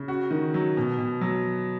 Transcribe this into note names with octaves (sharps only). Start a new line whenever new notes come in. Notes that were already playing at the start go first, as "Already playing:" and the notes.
Already playing: C#3
F#4
D#3
F#3
B2
B2
F#3